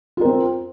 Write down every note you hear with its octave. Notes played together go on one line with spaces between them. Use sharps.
C4 F4 A#4